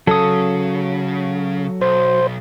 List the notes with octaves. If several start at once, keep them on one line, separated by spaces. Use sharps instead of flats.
C#3 F#3 A4 D#6
B1 C5